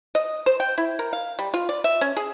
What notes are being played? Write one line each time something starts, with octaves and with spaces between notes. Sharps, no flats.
D#5
C5
G5
E4
A#4
F5
G3
F4
D5
E5
C#4
G#4